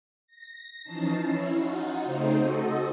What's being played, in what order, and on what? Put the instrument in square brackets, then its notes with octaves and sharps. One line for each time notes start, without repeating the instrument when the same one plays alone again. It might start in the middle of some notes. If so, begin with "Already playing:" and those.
[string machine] A#6
E3 F3 C#4 D#4 A5 C7
C#4 E4
D#4 F4 F#4
C#3 A3 C4 D#4 C5
F#4 A4 D#5